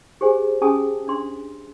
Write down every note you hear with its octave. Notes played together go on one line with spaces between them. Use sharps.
G4 G#4 C5 G#5
C#4 G4 G#4 G#5 A5 D#6
D4 C6